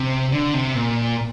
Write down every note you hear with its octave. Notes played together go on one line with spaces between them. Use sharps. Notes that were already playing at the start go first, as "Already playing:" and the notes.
Already playing: C3
D3
C3
A#2